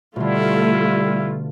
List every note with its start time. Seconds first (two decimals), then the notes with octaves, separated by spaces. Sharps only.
0.16 B2 D3 G3 A3 E4 F4